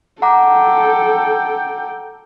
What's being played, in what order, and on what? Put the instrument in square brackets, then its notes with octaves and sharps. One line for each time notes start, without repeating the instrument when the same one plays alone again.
[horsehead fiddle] A4 G5 [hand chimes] F#5 A#5 D6